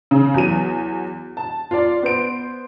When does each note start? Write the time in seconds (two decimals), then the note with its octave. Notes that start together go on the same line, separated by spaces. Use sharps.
0.11 C#3
0.34 E2 F#3 D#7
1.37 A5
1.71 F4 D5
2.03 B3 C5 D7